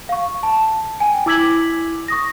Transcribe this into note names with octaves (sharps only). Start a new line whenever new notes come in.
F5 C#6
A5
G5 G#5
E4 D6 E6 G#6 B6 F#7
C#6 D#6 A#6